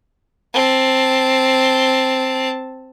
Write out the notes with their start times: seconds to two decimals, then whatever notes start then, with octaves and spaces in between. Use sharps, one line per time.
0.54 C4 A5